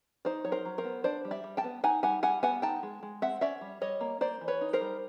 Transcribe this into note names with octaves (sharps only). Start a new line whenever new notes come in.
D#4 C5 D5
F#3 C#5
A#4 C5
F#3
A#4 C5
B3
D4 C5 D5
G3
D5 E5
G3
G5 A5
B3
D#4 F#5 G#5
G3 F#5 G#5
G3 F#5 G#5
B3 F#5 G#5
D#4 G5 A5
G#3
G#3
C4 E5 F#5
C#4 D5 E5
G3
G3 C#5 D#5
A#3
A#3 C5 D5
E3
B4 C#5
D#4
A#4 C5
G3